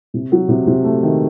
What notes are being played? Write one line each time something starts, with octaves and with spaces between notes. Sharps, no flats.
C3
F#3
C3
C3
A3
D#3